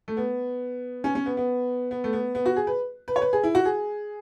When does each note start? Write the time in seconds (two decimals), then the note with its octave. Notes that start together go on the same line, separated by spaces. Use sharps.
0.08 A3
0.17 B3
1.04 C#4
1.15 C#4
1.26 B3
1.37 B3
1.91 B3
2.04 A3
2.13 B3
2.35 B3
2.46 F#4
2.56 G#4
2.67 B4
3.08 B4
3.16 C#5
3.22 B4
3.33 G#4
3.44 E4
3.55 F#4
3.65 G#4